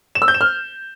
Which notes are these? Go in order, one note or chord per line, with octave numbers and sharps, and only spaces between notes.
E7
E6
G6
E7
F6